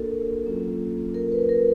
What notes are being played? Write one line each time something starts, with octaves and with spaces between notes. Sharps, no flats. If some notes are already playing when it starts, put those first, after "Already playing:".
Already playing: A#3 D4 F#4 A4 A#4
F#3 A#3 C#4 F4
A#4
B4
A#4